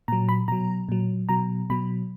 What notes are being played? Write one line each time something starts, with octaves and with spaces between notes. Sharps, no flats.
A#2 F#3 A#5
B5
B2 F#3 A#5
A#2 F#3
B2 F#3 A#5
B2 F#3 B5